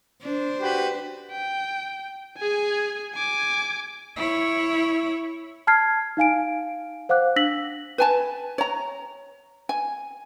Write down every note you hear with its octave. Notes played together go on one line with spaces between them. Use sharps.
D4 C5
F#4 G4 B4
G5
G#4 G#5
G#5 D6
E4 C#5
A5 F6 G#6 C7
D#4 F5 G#5 D7
C5 F5 F#5 D6 F#6
D4 E6 A#6 B6 F#7
B4 G#5 A5
C#5 A#5
G#5